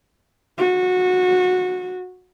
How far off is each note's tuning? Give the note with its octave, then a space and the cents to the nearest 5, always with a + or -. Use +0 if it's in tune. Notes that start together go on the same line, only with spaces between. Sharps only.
F#4 -20